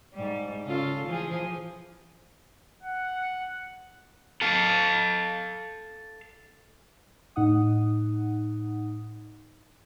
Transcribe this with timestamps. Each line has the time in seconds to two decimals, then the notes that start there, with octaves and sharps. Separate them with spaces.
0.14 G#2 G3
0.66 C#3 F4 A4
1.07 E3 F3 G#4
2.83 F#5
4.41 A4 F5
7.36 A2 D#4 F#5 D#6